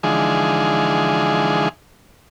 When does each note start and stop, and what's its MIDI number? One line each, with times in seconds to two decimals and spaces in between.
0.03 1.69 50
0.03 1.69 52
0.03 1.69 53
0.03 1.69 56
0.03 1.69 63
0.03 1.69 68